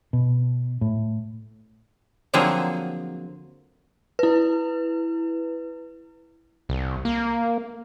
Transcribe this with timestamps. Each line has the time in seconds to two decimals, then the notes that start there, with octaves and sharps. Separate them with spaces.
0.13 B2
0.81 A2
2.34 D3 F3 F#3 A#3 C4 G#4
4.19 E4 B4
6.69 C2
7.05 A#3